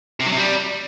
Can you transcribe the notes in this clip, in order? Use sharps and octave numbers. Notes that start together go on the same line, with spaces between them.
C3
F#3
C3
G3